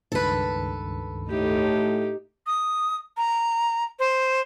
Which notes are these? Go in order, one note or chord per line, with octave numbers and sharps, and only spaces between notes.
C#2 G2 D#3 A4 B4
A2 A3 D#4 G4
D#6
A#5
C5